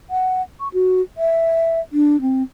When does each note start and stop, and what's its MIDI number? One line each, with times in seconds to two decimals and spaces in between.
0.10 0.42 78
0.60 0.68 85
0.74 1.02 66
1.18 1.80 76
1.92 2.20 62
2.21 2.43 60